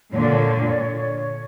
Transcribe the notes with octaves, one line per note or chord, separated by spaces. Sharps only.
A#2 D3 C#5
D5
C#5
C#5
D5
C#5